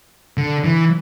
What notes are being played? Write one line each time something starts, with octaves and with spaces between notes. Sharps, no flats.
D3
E3